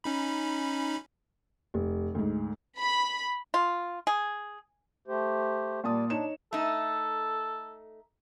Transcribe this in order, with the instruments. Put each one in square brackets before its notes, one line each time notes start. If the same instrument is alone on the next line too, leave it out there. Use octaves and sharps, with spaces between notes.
[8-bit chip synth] C#4 D#4 B5
[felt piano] F1
D2 G#2
[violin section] B5
[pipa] F4
G#4
[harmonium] A3 G4 C5
[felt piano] A#2 A5 D#6 [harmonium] G3 D5
[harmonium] D4 [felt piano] D#4 C#5 E7
[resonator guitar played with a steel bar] A3 D#4 [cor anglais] A4